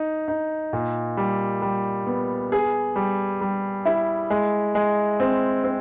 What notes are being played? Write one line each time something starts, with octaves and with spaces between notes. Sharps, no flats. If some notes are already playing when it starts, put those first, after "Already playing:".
Already playing: D#4
D#4
A#2
G3
G3
B3
G#4
G3
G3
E4
G#3
G#3
C4
C4